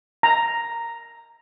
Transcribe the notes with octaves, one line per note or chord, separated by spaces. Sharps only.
A#5